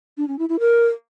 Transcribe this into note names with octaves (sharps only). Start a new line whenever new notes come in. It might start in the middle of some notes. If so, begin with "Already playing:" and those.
D4
C#4
E4
E4
A#4